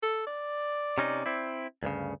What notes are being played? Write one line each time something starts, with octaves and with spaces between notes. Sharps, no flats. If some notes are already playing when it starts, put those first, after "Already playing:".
A4
D5
C3 C#4 D#4
C4 E4
D2 G2 C#3